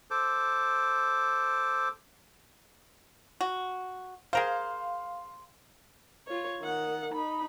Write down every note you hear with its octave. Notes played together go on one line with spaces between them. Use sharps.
A4 C5 D6
F#4
G#4 A#4 C5 F5
F4 C#5
D#3 F#5
D#4 B5